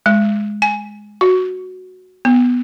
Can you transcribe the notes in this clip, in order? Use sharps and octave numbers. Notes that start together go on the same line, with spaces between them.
G#3
G#5
F#4
B3